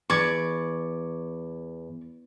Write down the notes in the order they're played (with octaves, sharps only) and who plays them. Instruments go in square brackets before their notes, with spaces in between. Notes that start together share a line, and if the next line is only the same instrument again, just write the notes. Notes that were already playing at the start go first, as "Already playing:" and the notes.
[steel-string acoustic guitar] E2 [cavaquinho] C#5 D5 C#6